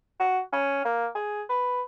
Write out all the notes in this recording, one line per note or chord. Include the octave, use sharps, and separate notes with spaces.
F#4
C#4
A#3
G#4
B4